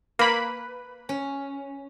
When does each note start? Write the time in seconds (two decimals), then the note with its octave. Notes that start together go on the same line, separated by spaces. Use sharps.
0.19 A#3 B4 B5
1.09 C#4